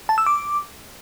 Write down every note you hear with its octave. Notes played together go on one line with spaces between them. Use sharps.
A5
E6
D6